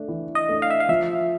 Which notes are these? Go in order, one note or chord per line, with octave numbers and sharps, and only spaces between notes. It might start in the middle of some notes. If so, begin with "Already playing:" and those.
Already playing: A3 D4
E3
D#5
A3 D4
F5
E5
F5
F3 E5